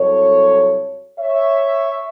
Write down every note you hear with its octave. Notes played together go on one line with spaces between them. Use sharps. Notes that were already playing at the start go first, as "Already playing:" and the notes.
Already playing: C2 C3 F#3 A4 C#5
C#5 E5